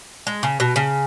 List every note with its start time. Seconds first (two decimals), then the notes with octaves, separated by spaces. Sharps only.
0.27 G#3
0.43 C#3
0.60 B2
0.76 C#3